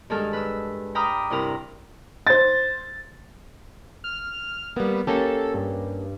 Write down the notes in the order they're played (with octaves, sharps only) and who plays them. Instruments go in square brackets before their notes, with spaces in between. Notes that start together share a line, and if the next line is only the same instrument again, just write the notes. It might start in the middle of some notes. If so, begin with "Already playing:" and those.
[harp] G2 D#3 G#3 G#4 A4 F6
B4 E6
G5 A#5 B5 D6 D#6 F6
G2 C3 E4 A#4 A#5
[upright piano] C5 A6
[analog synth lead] F6
[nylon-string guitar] G3 A#3 [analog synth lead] B3
[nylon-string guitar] A#3 C#4 G4 [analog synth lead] A4
[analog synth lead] G2